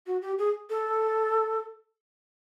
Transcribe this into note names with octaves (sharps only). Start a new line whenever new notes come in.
F#4
G4
G#4
A4